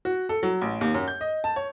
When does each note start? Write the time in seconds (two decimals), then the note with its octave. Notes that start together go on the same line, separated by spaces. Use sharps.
0.05 F#4
0.29 A4
0.43 F#3
0.61 A1
0.81 D#2
0.94 F#2
1.08 G6
1.21 D#5
1.44 A5
1.56 C#5